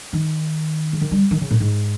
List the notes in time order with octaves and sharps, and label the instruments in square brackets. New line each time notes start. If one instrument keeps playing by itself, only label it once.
[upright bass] D#3
C#3
D#3
G3
D#3
C#3
A#2
G#2